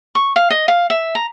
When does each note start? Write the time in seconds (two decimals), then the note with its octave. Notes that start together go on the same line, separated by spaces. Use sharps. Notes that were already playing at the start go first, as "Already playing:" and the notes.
0.15 C#6
0.36 F5
0.50 D#5
0.68 F5
0.90 E5
1.15 A#5